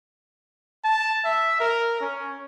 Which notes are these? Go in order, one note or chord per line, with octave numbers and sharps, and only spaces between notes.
A5
E5
A#4
C#4